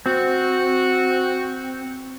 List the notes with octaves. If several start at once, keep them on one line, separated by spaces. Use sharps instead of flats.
C4 F#4